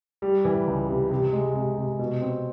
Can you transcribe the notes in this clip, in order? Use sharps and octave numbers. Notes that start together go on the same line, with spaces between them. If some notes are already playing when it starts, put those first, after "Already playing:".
G3
E3
C#2
C3
C3
G#3
C3
C3
B2
C4